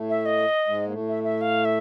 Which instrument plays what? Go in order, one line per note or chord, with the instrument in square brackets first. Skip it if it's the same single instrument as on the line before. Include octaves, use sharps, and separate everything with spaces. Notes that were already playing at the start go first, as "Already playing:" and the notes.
Already playing: [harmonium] A2 A3
[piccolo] E5
D#5
[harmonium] G#2 G#3
A#3
A2 A3
[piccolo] E5
E5
F5
E5